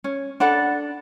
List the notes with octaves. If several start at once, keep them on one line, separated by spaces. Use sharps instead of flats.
C#4
D4 A4 F#5 B5